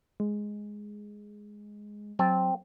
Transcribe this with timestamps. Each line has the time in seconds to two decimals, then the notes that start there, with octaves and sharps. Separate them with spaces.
0.20 G#3
2.19 F#3 C4 A5